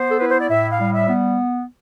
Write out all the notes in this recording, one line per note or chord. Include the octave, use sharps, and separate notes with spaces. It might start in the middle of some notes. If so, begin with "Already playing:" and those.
Already playing: B3 C5
A4
E4 B4
C5
D5
A2 E5
F5
G3
E5
B3